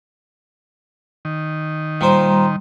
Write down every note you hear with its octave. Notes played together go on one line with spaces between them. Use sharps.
D#3
A#2 G3 C5 A#5 C6